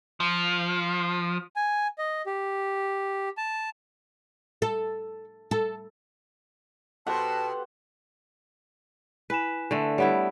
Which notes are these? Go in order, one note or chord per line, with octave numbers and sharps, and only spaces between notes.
F3
G#5
D#5
G4
A5
A4
A4
B2 G4 A4 C5 F#5 A5
E4 B4 G#5 E7
D3 A3
G3 B3 E4 C#5 F#5